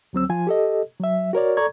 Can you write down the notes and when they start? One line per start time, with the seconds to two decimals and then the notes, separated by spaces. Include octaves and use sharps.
0.13 D2 F#3 C4 E6
0.29 F3 F4 G#5
0.47 G4 A4 D#5
1.00 F#3 E5
1.33 F#4 A#4 C#5 D5
1.57 A4 D5 A#5 C#6 G#6